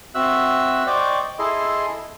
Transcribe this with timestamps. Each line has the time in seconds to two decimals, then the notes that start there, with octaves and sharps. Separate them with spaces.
0.15 C4 F#4 E5 E6 F#6
0.87 C5 D5 D#5 G5 C#6 D6
1.39 E4 G#4 A4 D#5 C6